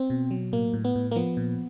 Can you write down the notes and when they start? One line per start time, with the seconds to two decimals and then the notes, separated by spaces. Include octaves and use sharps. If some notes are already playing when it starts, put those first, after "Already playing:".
Already playing: C4
0.10 B2
0.31 F#3
0.52 A2 A#3
0.73 A2
0.85 B3
0.96 A2
1.11 A#3
1.16 F3 B3
1.37 A#2